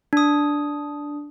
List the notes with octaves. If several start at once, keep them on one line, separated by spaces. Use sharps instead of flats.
D4 D#6